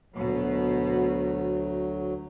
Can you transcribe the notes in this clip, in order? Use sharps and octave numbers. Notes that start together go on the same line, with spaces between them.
D2 B2 F#3